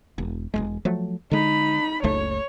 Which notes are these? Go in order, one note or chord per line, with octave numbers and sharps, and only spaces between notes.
E1
E1 E2 G#3
F3 F#3 A3
D3 G#3 D#4 B5
F#1 C#2 A3 C#5